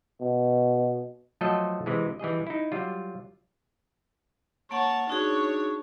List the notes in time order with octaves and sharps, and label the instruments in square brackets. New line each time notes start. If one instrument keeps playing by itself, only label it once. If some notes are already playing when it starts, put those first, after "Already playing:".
[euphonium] B2
[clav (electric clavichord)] F3 F#3 A3 A4 C5 D#5
C3 E3 G#3
E3 G3 G#4 D#5
D#4 E4
F#3 G3 F4
[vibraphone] A#3 F#5 [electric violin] C#5 A5
[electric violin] D4 C#5 [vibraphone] D#4 F#4 G#4